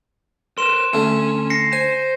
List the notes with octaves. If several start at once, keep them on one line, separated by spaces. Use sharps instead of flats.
A#4 B4 C6 E7
D2 A3 C#4
A#6 C7 C#7
C5 G#5